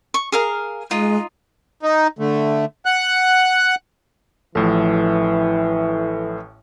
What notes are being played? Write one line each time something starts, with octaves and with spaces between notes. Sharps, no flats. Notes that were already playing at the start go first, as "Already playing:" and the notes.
C#6
G#4 A#4 F5
G#3 D#4 F4
D#4
D3 A3
F#5 F#6
A1 A2 E3 F3 A4